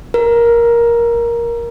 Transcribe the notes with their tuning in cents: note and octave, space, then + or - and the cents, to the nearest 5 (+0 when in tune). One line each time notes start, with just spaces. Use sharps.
A#4 +10